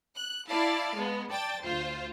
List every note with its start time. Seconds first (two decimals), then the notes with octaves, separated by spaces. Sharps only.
0.16 F#6
0.48 E4 D5 F5 A5
0.96 G#3 B3
1.32 D5 G5 A5 A6
1.63 D2 F4 C5